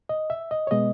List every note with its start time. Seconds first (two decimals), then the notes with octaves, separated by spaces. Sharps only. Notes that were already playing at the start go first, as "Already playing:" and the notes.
0.09 D#5
0.30 E5
0.51 D#5
0.67 C#5
0.71 B2 G#3 B3 D#5